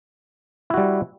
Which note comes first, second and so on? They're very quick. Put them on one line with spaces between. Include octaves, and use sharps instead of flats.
E4 F#4 G3